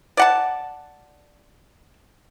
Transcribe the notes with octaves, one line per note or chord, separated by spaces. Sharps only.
D5 F#5 A5